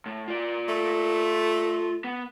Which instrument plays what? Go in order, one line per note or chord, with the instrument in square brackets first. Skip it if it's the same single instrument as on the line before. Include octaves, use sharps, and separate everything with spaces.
[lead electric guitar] A2
F4 D5
[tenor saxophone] A3
[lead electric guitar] B3